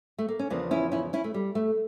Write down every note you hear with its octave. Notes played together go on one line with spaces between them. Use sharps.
A3
A#3
C#4
E2 C#3 F3 A#3 D4
C#4 E4
C#4 E4
C#4 E4
A3
G3
A3